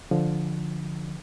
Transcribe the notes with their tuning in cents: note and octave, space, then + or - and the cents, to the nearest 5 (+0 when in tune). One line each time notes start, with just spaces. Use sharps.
D3 +0 F3 +0